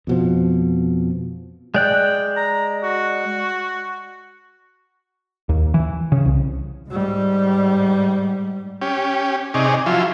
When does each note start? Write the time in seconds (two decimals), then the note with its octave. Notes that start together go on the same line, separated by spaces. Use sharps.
0.07 F2 B2 F3
1.74 G#3 D5 G5 F#6
2.37 A#5
2.83 F#4
5.49 D#2
5.74 E3
6.12 C#3
6.25 C2
6.89 G#2 G3
8.82 C#4 G4
9.54 C3 D#4 G#4 C#5 D5
9.86 F3 F#3 E4 F4